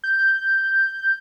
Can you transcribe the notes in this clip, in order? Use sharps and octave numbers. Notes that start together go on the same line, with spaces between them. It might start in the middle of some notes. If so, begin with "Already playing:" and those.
G6